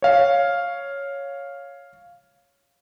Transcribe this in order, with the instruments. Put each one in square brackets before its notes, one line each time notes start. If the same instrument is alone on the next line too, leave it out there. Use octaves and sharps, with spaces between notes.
[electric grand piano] C#5 F5